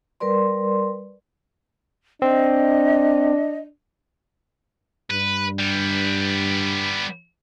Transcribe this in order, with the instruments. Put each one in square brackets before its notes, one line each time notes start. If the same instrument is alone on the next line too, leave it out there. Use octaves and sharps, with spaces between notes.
[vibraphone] G3 A#4 B4 D5 C6
[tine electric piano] C4 [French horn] D4 [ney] D#5
[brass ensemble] G2 [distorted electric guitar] B4
[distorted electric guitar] G3 B3